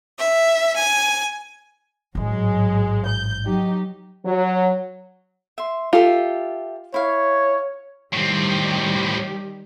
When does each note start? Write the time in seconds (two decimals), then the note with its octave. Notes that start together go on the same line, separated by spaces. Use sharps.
0.18 E5
0.75 G#5
2.15 A1 G#2 F#3 G#3
3.06 G6
3.45 F#3 D#4 G4
4.25 F#3
5.58 E5 C6
5.93 F4 G4 A4 E5
6.94 E4 C#5 F5
8.13 A2 D#3 G3 C4 G4